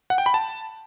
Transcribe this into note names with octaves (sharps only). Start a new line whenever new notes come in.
F#5
G5
B5
A5